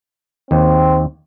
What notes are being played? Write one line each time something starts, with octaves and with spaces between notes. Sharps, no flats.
D#2 C4